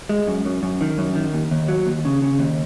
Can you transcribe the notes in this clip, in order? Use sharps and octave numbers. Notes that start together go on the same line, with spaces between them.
G#3
F#2
F#2
F#2
D#3
F#2
D#3
D#2
D#2
F#3
D#2
C#3
C#3
D#2